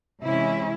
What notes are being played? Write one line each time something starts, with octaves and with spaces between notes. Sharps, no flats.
C3 E3 G#3 C#4 E4